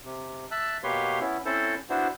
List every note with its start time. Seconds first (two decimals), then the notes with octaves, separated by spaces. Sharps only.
0.04 C3
0.51 E5 A5 E6 F#6
0.84 B2 A#3 G4 B4 C#5 C6
1.20 B3 C#4 E4
1.45 C4 C#4 E4 A4 C5
1.90 B3 D4 E4 F#4 C5